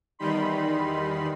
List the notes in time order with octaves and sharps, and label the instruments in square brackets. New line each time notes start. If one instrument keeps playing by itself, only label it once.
[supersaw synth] E2 D#3 G3 D#4 B5 C6